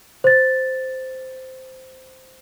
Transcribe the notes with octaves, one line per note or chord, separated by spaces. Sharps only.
C5 A6